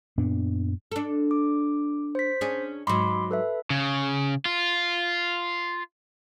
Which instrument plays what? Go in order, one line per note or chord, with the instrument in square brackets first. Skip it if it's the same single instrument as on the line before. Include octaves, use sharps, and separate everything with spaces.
[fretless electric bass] F#2 A#2 B3 D4
[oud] D4 A4
[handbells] D6
C5 B6
[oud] C#4 D4 G#4
[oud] G#2 F#3 [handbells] B5 C6 D6
[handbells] A4 B4 E5
[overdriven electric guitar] C#3
F4